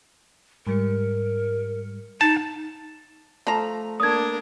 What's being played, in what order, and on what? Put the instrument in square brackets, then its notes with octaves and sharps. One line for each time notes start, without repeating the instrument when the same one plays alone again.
[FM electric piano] G#2 G3 C#7 [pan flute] A#4
[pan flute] D#4 [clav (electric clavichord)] A5
[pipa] F3 A#5 [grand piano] A3
[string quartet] A#3 D4 A#4 [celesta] D#6 G#6